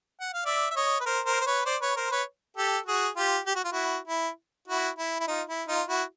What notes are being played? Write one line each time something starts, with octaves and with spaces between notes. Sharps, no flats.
F#5
F5
D5 E5
E5
C#5 D#5
B4
A#4 C5
A#4 C5
C5
B4 C#5
C5 D5
B4 C#5
A#4 C5
B4 C#5
G4 A4
F#4 G#4
F4 G4
G4
F#4
F4
E4 F#4
E4
E4 F#4
E4
E4
D#4 F4
E4
D#4 F4
E4 F#4